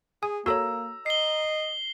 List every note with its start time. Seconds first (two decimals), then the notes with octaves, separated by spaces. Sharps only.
0.23 G#4 G#5 D#6
0.46 A#3 F#4 A4 C#5 A#5 E6
1.06 D#5 C7 G7